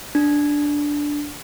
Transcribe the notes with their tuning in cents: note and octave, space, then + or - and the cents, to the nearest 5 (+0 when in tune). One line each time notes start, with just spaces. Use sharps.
D4 -5